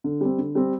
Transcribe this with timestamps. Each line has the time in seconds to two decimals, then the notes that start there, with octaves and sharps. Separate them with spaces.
0.04 D3
0.21 G3 C4
0.38 D3
0.55 G3 C4